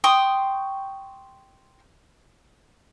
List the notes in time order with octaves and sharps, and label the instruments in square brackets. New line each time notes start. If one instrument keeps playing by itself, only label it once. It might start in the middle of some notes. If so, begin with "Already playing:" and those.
[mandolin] G5 C6 C#6 D#6